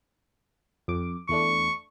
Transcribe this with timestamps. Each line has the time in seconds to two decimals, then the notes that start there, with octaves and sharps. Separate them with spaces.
0.88 F2 D6
1.29 E2 A3 D4 C#6